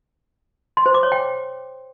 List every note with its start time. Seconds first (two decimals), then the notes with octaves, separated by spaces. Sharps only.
0.77 C6
0.86 C5
0.94 D6
1.03 C#5
1.12 G5